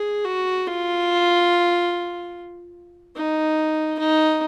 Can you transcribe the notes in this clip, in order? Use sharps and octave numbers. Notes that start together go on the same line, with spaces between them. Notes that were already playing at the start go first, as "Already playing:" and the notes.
Already playing: G#4
F#4
F4
D#4
D#4